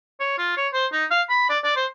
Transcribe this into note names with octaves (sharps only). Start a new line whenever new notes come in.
C#5
F4
C#5
C5
D#4
F5
B5
D5
D5
C5